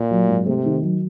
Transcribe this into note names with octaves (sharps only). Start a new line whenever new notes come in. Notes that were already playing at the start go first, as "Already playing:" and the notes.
Already playing: A#2
F#3
G#2
C3 A3
D#3
F#3